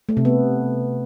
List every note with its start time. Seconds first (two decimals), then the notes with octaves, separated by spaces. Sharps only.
0.09 A3
0.17 C3
0.25 B3